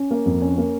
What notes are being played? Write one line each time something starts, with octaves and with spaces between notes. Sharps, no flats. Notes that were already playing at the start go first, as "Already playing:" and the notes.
Already playing: C#4
A#3
F2
C#4
A#3